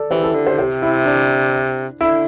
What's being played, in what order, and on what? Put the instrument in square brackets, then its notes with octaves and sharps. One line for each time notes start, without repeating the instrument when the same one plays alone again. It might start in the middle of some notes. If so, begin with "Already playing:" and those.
Already playing: [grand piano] A4 D5
[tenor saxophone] E3 [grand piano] G4 C5
[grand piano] E4 A4
[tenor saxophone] D3
[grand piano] G4 C5
[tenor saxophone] C3 [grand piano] G4 C5
[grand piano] E4
D4
[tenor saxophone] D3 [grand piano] E4